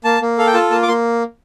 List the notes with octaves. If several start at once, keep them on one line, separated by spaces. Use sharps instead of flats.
A#3 A5
A#3
A4 F5
G5
F4 A5
A#3 A5
D6
A#3 C6